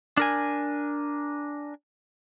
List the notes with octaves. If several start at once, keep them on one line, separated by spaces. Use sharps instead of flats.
D4 A#4 G#5